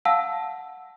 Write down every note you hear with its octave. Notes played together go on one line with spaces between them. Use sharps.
F5 F#5 A5 E6